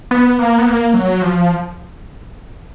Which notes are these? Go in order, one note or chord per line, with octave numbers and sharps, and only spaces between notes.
B3
A#3
B3
A#3
F#3
F3